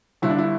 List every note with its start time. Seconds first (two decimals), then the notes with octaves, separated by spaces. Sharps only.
0.22 G1 G2 D3 E4
0.30 D4
0.38 E4